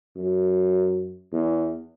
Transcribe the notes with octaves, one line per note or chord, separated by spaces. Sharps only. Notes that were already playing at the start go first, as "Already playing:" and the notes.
F#2
E2